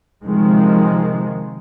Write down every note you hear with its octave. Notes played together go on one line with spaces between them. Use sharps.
C3 D#3 F3 G#3